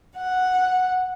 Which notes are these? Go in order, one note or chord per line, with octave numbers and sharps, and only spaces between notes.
F#5